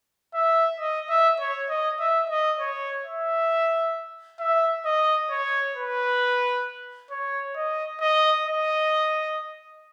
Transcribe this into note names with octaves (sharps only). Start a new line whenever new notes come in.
E5
D#5
E5
C#5
D#5
E5
D#5
C#5
E5
E5
D#5
C#5
B4
C#5
D#5
D#5
D#5